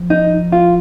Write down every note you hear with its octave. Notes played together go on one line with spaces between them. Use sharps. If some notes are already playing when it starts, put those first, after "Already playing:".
Already playing: F3
D#4
F4